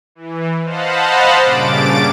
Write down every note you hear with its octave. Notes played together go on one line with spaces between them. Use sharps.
E3
C5 D#5 F5 F#5 A5 B5
G2 A#2 C#3 D6 A6 D7